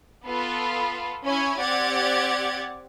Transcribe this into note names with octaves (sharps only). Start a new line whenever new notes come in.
B3 F4 A4 B4
C#4 E4 C#5 G#5
C4 G4 D5 F#5 G#6 A6